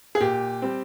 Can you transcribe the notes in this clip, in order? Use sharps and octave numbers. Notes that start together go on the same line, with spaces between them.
G#4
A#2 G4
G3 C4